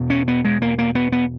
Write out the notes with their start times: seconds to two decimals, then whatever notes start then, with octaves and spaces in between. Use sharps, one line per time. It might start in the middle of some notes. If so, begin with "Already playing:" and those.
Already playing: E2 B2
0.10 C#4
0.28 B3
0.45 G#3
0.62 A#3
0.79 A#3
0.95 B3
1.12 B3